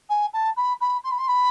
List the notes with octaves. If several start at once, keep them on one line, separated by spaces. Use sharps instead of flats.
G#5
A5
B5
B5
C6
B5
C6
B5